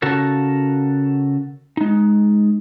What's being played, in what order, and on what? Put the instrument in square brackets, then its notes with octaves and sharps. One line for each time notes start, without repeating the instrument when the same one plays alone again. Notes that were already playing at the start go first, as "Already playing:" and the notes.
[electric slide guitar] C#3 F#4 A4 A#4
G#3 D#4